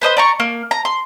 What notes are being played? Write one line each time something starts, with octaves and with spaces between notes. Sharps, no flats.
B4 C5 D#5 B5
D5 A#5 C#6
A#3
A#5
C6